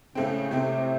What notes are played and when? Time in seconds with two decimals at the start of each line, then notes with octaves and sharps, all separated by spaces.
0.15 A2 C#3 A3 C4
0.51 A2 C3 A3 C4